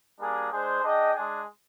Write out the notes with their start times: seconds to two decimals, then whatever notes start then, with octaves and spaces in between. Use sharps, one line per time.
0.19 G3 A#3 D4 G#4
0.52 G#3 D4 G#4 C5
0.83 D4 G#4 D#5 G5
1.14 G#3 D4 G#4